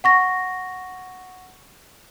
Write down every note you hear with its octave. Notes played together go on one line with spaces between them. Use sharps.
F#5 C#6 A#6